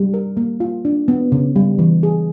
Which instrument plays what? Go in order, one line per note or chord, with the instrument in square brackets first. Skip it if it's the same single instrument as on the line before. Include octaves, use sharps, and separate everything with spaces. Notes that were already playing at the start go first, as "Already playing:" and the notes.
Already playing: [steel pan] G3
A#4
A#3
F4
D4
B3
C#3
G3
E3
G#4